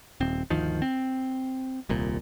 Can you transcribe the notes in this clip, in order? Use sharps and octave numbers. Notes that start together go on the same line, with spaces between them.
D#1 C4
G1 D2 D#3 F3
C4
D#1 C2 A#2